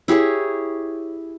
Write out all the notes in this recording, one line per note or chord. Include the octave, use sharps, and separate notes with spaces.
E4 G4 G#4 C#5